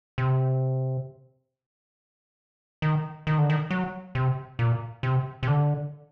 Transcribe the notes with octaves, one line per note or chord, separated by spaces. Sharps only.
C3
D#3
D#3
D3
D#3
F#3
C3
A#2
C3
C3
D3